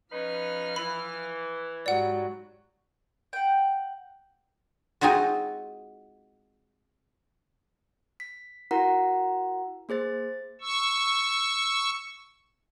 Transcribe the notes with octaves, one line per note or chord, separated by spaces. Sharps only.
F3 C#4 D#4 B4 F6
E3 B5
G#2 F#3 G3 D5 F#5
F#5 G5
G#3 C4 D#4 F4 F#4
B6
E4 F#4 A#4 F#5 A#5
A#3 G#4 C5 A6
C#6 E6